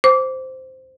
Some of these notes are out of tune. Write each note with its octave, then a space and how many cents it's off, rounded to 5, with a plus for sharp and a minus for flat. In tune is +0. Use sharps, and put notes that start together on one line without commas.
C5 -5 D6 -20